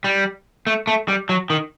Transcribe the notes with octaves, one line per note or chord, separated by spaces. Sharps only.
G3
A3
A3
G3
F#3
D#3